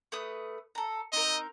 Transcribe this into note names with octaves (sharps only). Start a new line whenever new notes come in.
A3 B4 D#6
A4 A#5
C4 D#4 A#4 D#5